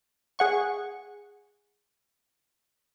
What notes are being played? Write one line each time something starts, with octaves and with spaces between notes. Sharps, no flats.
G#4 F#5 C#6